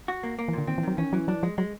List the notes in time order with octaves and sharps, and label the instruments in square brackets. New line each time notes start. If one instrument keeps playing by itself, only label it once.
[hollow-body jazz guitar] F#4
A#3
A#3
[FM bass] E3
[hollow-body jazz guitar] A#2 [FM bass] D3
[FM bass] D#3 [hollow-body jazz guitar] C4
[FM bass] E3
[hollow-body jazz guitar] D#3 [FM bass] F#3
[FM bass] E3 [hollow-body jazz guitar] C#4
[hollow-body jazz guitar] E3 [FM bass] F#3
[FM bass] F#3 [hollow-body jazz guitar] D4
[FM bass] F3 [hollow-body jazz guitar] G#3
[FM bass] F#3 [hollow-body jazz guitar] G#3